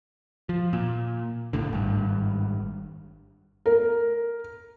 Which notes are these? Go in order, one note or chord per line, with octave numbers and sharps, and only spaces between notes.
F3
A#2
A#1 A2 D3
G#1 G2
A#4